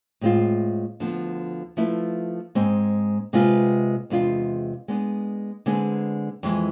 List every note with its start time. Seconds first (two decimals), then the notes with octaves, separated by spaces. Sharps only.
0.21 A2 G#3 C4 F4
1.00 D2 D3 F3 B3
1.77 F3 A3 E4 B4 E5
2.55 G#2 G#3 C4
3.33 C3 G#3 C4 F4 B4
4.10 E2 C3 G#3 D4 F4
4.88 G#3 B3 D4
5.66 D3 G#3 C4 G#4 B4
6.43 F2 E3 G#3